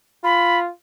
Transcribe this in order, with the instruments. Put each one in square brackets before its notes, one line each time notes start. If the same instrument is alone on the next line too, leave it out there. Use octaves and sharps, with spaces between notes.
[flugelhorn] F4 [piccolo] B5